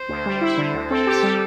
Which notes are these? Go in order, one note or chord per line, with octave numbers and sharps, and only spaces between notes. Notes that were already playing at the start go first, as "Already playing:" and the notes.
Already playing: C5
D2
G3
E4
D3
D2
C4 A4
G4
G3